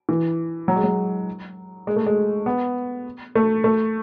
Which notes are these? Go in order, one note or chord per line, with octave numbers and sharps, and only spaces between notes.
E3
F#3
G#3
F#3
G#3
A3
G#3
B3
A3
A3